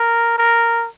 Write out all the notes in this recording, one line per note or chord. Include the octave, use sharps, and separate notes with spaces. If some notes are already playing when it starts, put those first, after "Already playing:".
Already playing: A#4
A#4